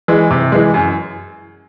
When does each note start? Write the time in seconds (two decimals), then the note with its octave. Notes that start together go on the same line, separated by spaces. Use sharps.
0.08 E3 G#3
0.31 C3
0.52 E3 G#3
0.74 F#2